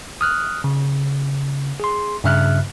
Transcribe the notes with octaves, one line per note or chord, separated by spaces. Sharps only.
D#6 F6 F#6
C#3
G#4 C6
G2 C#3 E5 F6 F#6